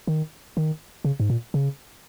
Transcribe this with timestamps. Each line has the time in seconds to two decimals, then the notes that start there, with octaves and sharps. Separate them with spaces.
0.07 D#3
0.57 D#3
1.05 C#3
1.20 G#2
1.30 A#2
1.54 C#3